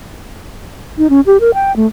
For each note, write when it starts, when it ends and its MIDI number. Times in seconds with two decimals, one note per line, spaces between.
0.98 1.10 63
1.10 1.21 61
1.26 1.40 67
1.40 1.51 70
1.54 1.74 79
1.76 1.86 57